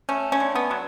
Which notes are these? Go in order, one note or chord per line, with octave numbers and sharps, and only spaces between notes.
A3 C#4
C#4
D3
B3
F#3